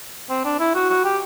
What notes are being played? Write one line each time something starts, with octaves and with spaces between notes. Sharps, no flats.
C4
D4
E4
F#4
F#4
G4